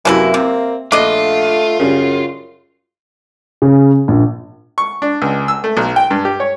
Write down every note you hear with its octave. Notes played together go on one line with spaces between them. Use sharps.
F#2 C3 E3 F#3 A#3 D4 E4
C3 C4
A#1 A3 D4 F4 D#5
F#2 C#3 G3
C#3
A#1
C#6
D4
C#2
E6
A3
B1
G5
G2
G4
C#5